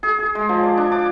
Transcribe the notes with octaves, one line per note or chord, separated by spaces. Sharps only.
G#4
G#4
G#3
F3
D5
D4
D6